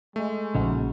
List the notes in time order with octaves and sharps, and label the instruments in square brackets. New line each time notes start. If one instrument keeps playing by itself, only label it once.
[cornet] G#3 [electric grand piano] A3
[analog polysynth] A#1 [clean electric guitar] C#3 D#4 F#4